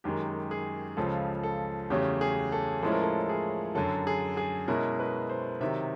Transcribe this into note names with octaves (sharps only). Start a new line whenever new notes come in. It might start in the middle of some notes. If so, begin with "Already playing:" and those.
F#2 D#3 G#3 G4
G#4
C#2 C#3 F3 A4
A4
E2 C#3 F#3 A3 C#4 G4
G#4
A4
A2 F3 G#3 C#4 E4 A4
A#4
A4
G#4
F#2 D3 F#3 A4
G#4
G#4
B2 G#3 C#4 E4 A#4
B4
C5
C3 D#3 F#3 E5